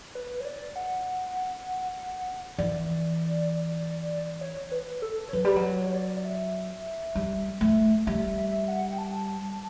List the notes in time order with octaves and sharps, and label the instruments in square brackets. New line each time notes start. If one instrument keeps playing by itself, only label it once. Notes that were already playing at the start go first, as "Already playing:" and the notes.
[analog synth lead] B4
C#5
D5
F#5
[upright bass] E3 [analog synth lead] D5
[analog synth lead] C#5
B4
A4
C#5
[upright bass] F#3 [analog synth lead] B4
[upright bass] G3
F#3
[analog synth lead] C#5
C#5
D5
D5
E5
[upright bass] G3
A3
[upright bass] G3 [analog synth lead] E5
[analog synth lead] E5
F#5
G5
A5